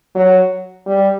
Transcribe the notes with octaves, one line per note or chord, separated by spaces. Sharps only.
F#3
G3